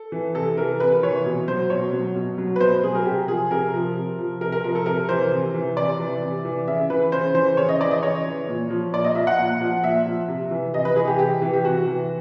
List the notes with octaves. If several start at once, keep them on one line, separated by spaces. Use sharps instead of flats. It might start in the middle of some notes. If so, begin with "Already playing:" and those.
Already playing: A4
E3
C3 A4
E3 A#4
C3 B4
E3 C#5
B2
F#3 C5
B2 C#5
F#3
B2
F#3
B4
B2 C5
F#3 G#4
A#4
C3 G4
F3 G#4
C3 A#4
F3
C3
F3
C3 A#4
A#4
F3 A#4
A4
C3 A#4
E3 C5
C3
E3
C3 D5
E3
C3
E3
C#3 E5
E3 B4
C#3 C5
E3 C5
C#3 C#5
D#5
E3 D5
D#5
C#3 C#5
E3
A#2
F3
A#2 D5
D#5
F3 E5
F#5
A#2
F3
A#2 E5
F3
C3
E3
C3 D#5
B4
E3 G#4
G4
C3 G4
E3
G4
C3 F#4
E3